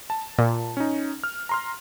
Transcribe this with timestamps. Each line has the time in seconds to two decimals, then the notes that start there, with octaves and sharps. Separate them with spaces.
0.10 A5
0.38 A#2
0.77 C#4 D#4
1.24 F6
1.49 A#5 C6 F6